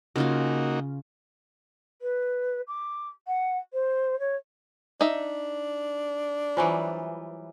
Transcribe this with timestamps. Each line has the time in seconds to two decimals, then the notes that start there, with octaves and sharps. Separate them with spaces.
0.16 C#3 A#3 C#4 D#4 F4 F#4
2.02 B4
2.67 D6
3.27 F#5
3.73 C5
4.19 C#5
5.01 D4 D#4 E5
6.57 E3 F#3 G3 F4 C5 G#5